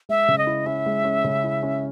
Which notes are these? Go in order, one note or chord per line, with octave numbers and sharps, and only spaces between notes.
G#3 E5
C#3
D#5
E4
C#4 E5
G#3
C#4
C#3
E4
C#4